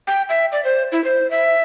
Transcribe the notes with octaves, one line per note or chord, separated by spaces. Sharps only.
G5
E5
D5
C5
E4
C5
E5